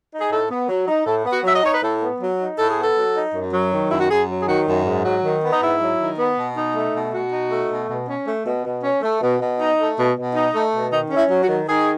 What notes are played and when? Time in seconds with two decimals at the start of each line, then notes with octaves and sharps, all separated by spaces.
0.12 D#4
0.20 G#4
0.31 A2 A4
0.50 B3
0.69 F#3
0.88 D#4
1.06 A2 A4
1.25 B3
1.32 F#4
1.44 F#3 E5
1.55 D#5
1.63 D#4 C#5
1.74 B4
1.82 A2 A4
2.01 B3
2.21 F#3
2.39 D#4
2.58 A2 A4
2.70 G#4
2.77 B3
2.83 A4
2.96 F#3
3.14 D#4
3.34 F#2
3.53 F#3
3.72 D#3
3.91 F#2 E4
4.00 F#4
4.09 F#2 G#4
4.28 F#3
4.42 G#4
4.47 D#3 F#4
4.67 F#2
4.85 G#2
5.04 F#3
5.23 D#3
5.43 B3
5.52 D#4
5.61 G#2 E4
5.80 F#3
6.00 D#3
6.18 B3
6.36 B2
6.57 D#4
6.74 A3
6.94 B2
7.13 B2 F#4
7.31 D#4
7.51 A3
7.70 B2
7.89 B2
8.08 C#4
8.27 A3
8.45 B2
8.65 B2
8.83 C#4
9.02 A3
9.22 B2
9.40 B2
9.60 D#4
9.78 A3
9.98 B2
10.16 B2
10.35 D#4
10.54 A3
10.73 B2
10.92 D#3 D#4
11.10 C#4
11.16 E4
11.29 F#3
11.42 F#4
11.48 D#3
11.68 D#3 G#4